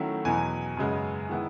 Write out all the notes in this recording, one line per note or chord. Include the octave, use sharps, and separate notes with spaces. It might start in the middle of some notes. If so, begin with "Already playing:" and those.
Already playing: D#3 F#3 A3 C#4 E4 F#5
E2 B2 F#3 G#5
F#2 C#3 G#3 B3
D#3 G#3 B3 E4